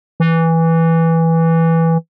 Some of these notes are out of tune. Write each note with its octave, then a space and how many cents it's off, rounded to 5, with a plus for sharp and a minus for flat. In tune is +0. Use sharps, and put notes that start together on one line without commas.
E3 -5